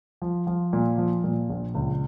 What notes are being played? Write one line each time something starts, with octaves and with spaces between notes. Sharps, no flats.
F3
F3
A#2
F3
A#2
A#1
C#2